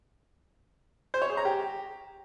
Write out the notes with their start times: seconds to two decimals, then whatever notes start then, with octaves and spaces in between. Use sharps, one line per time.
1.14 C5
1.22 C#5
1.29 G#4
1.37 A#5
1.45 G4